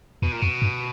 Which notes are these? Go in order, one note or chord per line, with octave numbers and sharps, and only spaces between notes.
E2 B2
A#2
F2 B2
G2